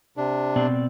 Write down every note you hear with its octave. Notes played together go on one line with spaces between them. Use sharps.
C3 D4
B2 C4 D5